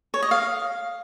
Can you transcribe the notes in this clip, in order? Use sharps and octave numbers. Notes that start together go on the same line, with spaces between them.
C#5
D#5
F5